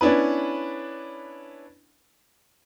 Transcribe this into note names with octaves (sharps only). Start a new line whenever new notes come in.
B3 C#4 D4 E4 B4